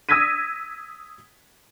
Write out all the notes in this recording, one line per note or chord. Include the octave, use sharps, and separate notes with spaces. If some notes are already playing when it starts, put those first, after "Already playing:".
D#6 E6 G#6 A#6 B6 D#7